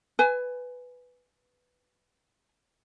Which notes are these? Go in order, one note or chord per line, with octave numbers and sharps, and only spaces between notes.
B4 G#5